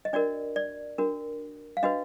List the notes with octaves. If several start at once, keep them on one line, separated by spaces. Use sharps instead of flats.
D#5
D4 F#4 A#4 D5
D5
D4 F#4 A#4
F5
D4 F#4 B4 D#5